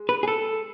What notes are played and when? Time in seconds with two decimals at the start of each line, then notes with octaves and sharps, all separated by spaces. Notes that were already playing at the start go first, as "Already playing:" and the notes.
Already playing: G#3
0.09 B4
0.23 G#4
0.28 A4